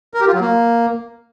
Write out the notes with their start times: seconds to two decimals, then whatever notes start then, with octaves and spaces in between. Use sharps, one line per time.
0.14 A#4
0.21 G4
0.27 F4
0.34 F#3
0.41 A#3